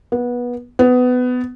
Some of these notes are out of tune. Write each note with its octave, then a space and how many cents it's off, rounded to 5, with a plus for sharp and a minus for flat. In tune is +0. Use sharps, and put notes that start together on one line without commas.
B3 -20
B3 +20